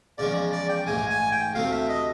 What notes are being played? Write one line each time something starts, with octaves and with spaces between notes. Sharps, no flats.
E2 C#3 F3 G#3 D5
D5
G5
A1 G#2 E3 G#3 G#5
G#5
G5
D2 C3 E3 A3 C4 F5
E5
D#5